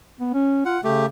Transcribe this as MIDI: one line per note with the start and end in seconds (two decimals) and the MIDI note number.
0.20 0.30 59
0.34 0.62 61
0.65 0.78 65
0.65 0.81 78
0.84 1.07 49
0.84 1.06 57
0.84 1.06 67